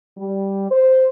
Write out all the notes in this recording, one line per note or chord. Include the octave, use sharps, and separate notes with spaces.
G3
C5